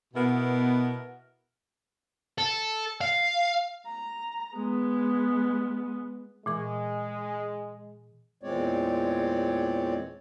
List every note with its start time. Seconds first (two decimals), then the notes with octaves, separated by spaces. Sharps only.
0.14 B2 B3 E4 A#4
2.38 A4
3.01 F5
3.86 A#5
4.55 G#3 B3
6.46 A#2 E3 G#3 C#6
8.43 E2 A#2 G#3 C4 C#5 D5